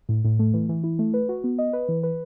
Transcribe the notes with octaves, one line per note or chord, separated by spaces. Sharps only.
A2
A2
A3
E3
E3
E4
A3
B4
F#4
B3
D#5
B4
E3
B4